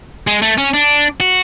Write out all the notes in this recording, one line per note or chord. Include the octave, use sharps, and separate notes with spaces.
G#3
A3
C#4
D4
F#4